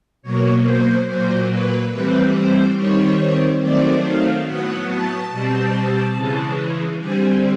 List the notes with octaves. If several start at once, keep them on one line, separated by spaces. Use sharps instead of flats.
B2 F#3 A#3 C#5
C5
A#2 F#3 A#3 C5
B4
A2 E3 G3 C4 B4
C5
D#3 G3 C4 C#5
D#3 F#3 A3 C4 D5
F5
A2 F#3 B3 F#5
A5
B2 G3 C4
C#3 E3 G#3
D3 G3 C4 G#5